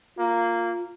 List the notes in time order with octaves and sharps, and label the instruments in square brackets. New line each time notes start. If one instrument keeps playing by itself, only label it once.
[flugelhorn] A#3 [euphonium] F4